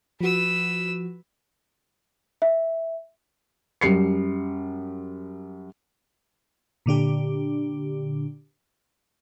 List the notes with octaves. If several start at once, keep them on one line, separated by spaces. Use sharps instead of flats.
F3 F#4 B4 E6
E5
F#2 G3 C7 C#7
A#2 D3 D4 G4